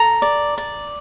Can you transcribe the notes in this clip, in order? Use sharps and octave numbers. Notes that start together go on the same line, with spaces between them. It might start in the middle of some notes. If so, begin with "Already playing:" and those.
Already playing: A4 A#5
D5
D5